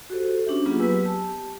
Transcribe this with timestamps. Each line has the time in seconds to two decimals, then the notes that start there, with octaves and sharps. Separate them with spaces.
0.10 F#4 G4 A4 C5
0.46 C#4 D4 G4 E5
0.66 F#3 A#3 B3 F4 G4 G#4
0.79 F#3 B3 B4 G#5 E6
1.05 G4 A5